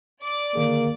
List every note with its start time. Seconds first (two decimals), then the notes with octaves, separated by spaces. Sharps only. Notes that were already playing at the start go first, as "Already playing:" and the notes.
0.20 D5 D6
0.55 D3 D#3 A#3 G#4